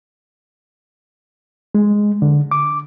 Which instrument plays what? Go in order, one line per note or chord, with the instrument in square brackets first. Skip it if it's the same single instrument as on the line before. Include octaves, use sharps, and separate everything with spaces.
[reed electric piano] G#3
D3
D6